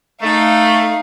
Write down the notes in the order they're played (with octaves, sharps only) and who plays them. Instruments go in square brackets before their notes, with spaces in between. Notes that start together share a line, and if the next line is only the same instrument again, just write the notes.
[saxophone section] A3 [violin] D#4 F5